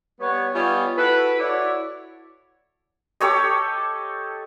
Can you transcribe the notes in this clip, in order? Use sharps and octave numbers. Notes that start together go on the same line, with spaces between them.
G3 B3 C#5
G3 B3 D#4 F4 C#5 G#5
E4 F#4 A4 B4
E4 F#4 A4 C#5 D5
G4 A4 C#5 D#5